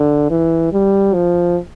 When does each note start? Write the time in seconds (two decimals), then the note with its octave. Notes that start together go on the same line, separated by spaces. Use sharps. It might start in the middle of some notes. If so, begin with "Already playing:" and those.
Already playing: D3
0.30 E3
0.72 G3
1.14 F3